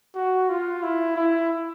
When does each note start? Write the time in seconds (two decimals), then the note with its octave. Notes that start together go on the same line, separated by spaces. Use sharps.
0.15 F#4
0.49 F4
0.83 E4
1.16 E4